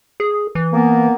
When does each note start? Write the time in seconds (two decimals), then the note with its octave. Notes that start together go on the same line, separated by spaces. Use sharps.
0.20 G#4
0.55 E3
0.72 A#3 B3